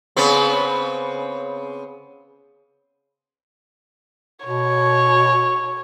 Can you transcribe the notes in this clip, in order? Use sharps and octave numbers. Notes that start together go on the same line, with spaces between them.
C#3 B3 C4
B2 C#5